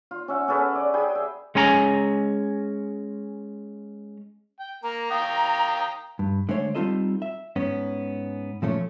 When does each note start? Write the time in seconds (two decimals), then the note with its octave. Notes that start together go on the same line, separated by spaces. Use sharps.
0.11 F4
0.28 C#4 E5 F#5
0.48 C#4 G#4 A4 B4
0.75 D5
0.94 G#4 G5 B5
1.15 E5
1.55 G#3 C#4 G#5 A#5
4.59 G5
4.83 A#3 A#5
5.11 F5 G5 D#6
6.19 G2
6.49 D3 G#3 A3 C5 C#5
6.75 G3 C4 D#4 F4 A4 D#5
7.22 E5
7.56 G#2 B3 C#4
8.62 A#2 F3 A3 C#4